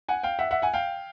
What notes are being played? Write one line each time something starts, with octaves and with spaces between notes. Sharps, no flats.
F#5 G#5
F5 G5
E5 F#5
E5 F#5
F#5 G#5
F5 G5